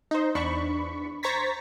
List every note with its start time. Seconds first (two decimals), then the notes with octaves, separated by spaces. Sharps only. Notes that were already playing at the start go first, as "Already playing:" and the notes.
0.11 D#4 C5
0.35 E2 D4 B5 C#6
1.23 C5 A#5 C#6 G#6 A6 B6